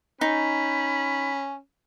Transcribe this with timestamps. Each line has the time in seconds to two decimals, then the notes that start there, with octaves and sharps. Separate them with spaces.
0.21 C#4 D#4 B5